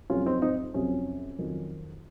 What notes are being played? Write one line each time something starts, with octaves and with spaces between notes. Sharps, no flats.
F2 C3 F#3 C#4 F4
C4 D#4
C4 D#4
F2 C3 F#3 C#4
F2 D#3 F#3